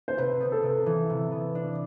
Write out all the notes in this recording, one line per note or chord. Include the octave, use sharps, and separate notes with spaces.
C5
C3 B4
B3
A4
C3
E3
C3
B3
D4